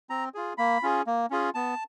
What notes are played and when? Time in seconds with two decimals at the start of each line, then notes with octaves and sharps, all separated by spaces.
0.10 C4 A#5
0.34 F4 G#4
0.58 A#3 B5
0.83 C#4 F4 G#4
1.07 A#3
1.30 C#4 F4 G#4
1.55 B3 A5